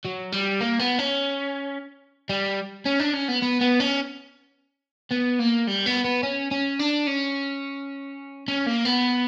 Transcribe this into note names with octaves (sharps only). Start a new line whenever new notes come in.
F#3
G3
A#3
B3
C#4
G3
C#4
D4
C#4
B3
B3
B3
C#4
B3
A#3
G3
B3
B3
C#4
C#4
D4
C#4
C#4
A#3
B3